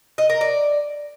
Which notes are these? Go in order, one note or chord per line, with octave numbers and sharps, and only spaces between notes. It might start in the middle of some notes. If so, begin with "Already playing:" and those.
D#5
A#4
D5